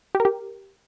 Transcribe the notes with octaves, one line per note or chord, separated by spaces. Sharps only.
G4
A#4
G4